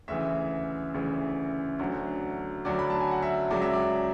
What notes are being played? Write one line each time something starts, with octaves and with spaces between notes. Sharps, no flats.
D2 C#3 E3 E5
D2 C#3 E3
D2 D3 F#3
D2 D3 F#3 D5
B5
A5
G#5
F#5
E5
C#2 C#3 F#3 D5
E5
D5